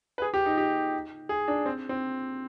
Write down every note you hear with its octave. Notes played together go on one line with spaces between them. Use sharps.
B4
G#4
G4
D#4
G4
G#4
D4
C4
C4